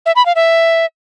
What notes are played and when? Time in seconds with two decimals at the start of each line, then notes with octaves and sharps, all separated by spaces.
0.06 E5
0.16 B5
0.26 F5
0.35 E5